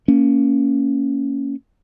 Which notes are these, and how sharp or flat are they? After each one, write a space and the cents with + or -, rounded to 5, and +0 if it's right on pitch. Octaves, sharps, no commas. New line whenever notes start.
A#3 -10 C#4 +0